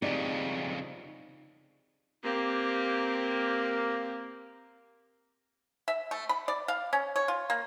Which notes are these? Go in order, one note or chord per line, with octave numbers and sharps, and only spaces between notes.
F2 C#3 D#4 G4 D5
A#3 C4 G4
E5
A3
B5
D5
F5
C#4
C#5
F4
A#3